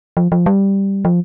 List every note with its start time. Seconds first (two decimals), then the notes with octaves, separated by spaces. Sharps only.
0.17 F3
0.32 F3
0.46 G3
1.05 F3